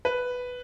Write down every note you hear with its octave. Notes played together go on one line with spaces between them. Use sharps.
B4